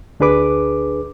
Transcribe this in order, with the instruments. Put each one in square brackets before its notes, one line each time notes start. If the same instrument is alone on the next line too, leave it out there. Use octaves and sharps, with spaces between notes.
[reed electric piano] D2 D4 G#4 B4 D6